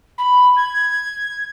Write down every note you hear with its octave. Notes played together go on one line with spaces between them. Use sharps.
B5
G#6